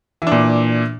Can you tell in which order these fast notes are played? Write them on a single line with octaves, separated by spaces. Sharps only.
E3 D4 A#2